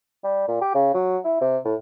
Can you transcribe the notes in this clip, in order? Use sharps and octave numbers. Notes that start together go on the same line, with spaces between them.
G3
A#2
G4
C#3
F#3
E4
C3
A2